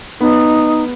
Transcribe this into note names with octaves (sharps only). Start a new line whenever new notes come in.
B3 D#4